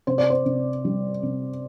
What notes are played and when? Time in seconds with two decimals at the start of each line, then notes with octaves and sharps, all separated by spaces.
0.07 C3 C5
0.18 D5
0.30 C5
0.45 C3
0.85 G3
1.23 C3